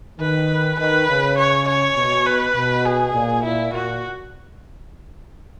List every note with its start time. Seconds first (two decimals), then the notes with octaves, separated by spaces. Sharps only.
0.20 D#3 B4
0.79 D#3 B4
1.09 C#3
1.38 C#5
1.68 C#5
1.97 B2
2.26 B4
2.56 B2
2.86 G#4
3.14 A#2
3.44 A#2 E4
3.73 A#2 F#4